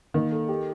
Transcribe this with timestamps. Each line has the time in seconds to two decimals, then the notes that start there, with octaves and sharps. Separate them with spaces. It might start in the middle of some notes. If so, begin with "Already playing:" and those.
0.14 D#3 A#3
0.32 A4
0.49 G4